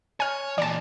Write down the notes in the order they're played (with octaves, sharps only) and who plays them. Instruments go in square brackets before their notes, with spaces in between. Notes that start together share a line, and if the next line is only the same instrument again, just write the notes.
[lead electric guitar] C#5 [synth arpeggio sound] G#5 F6
[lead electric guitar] A#2 E3 [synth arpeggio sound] D5 A5